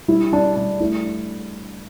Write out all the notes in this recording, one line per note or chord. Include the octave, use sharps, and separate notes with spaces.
G3 E4
G3 D4
G3 D4
A3 E4